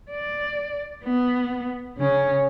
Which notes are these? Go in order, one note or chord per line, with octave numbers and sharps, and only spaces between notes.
D5
B3
C#3 C#4